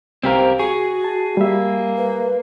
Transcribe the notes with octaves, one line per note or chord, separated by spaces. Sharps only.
C2 C4 G4 A#4 C5 F5
F#4 G#4 C#6
A5
G3 A#3 E5
B4